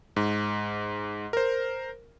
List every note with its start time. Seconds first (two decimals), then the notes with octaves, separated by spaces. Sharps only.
0.16 G#2
1.33 A#4 C5